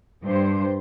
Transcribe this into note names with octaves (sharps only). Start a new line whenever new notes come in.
G2 C5